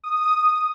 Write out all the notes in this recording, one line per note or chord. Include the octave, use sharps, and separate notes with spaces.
D#6